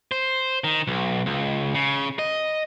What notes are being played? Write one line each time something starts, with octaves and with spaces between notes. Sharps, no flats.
C5
D#3
B1
C#2
C#3
D#5